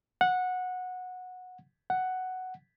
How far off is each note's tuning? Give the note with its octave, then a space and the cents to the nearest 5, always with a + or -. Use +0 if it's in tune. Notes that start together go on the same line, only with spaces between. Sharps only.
F#5 -15
F#5 +5